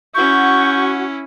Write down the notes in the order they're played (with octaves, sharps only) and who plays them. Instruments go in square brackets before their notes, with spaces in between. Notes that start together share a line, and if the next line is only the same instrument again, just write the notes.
[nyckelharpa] C#4 E4 [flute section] F#4 [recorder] C#6 [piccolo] G6